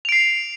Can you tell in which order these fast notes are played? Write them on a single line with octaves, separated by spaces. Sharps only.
F7 D7 C7